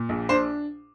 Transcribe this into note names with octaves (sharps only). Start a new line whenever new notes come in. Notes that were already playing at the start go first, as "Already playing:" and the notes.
Already playing: A#2
A#1
D4 C5